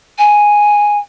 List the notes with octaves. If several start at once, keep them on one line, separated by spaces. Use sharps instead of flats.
G#5